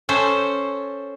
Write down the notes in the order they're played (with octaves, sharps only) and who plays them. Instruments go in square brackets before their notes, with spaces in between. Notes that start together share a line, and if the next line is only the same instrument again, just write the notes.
[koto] C#4 A4 C5